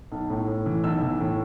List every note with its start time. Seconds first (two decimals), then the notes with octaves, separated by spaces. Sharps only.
0.12 B1
0.30 A2
0.47 A2
0.66 E3
0.84 B1 E6
1.02 E3
1.20 A2